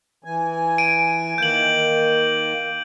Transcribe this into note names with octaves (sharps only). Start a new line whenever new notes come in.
E3 G#5
D7 D#7
D#3 A#3 G6 F#7